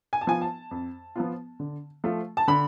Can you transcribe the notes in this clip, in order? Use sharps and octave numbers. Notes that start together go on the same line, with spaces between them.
G#5
A5
F3 B3 F4 G#5
A5
F2
F3 B3 F4
D3
F3 A3 F4
A5
D3 B5